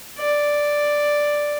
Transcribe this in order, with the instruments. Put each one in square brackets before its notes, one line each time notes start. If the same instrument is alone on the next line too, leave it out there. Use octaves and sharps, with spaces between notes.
[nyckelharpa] D5